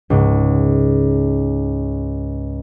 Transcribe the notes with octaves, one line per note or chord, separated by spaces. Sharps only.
C#2 G#2